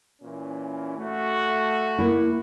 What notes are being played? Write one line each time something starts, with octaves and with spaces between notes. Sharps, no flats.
A#2 E3 C#4
A3 F#4
A#3 E4